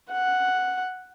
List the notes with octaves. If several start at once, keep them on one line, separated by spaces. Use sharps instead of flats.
F#5